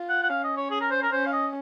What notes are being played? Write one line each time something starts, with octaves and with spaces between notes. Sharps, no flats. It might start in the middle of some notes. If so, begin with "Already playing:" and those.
Already playing: F4
F#5
F#5
C#4 F5
D#5
C#5
G#4
A#4
C5
A#4
C#4 C5
F5
D#5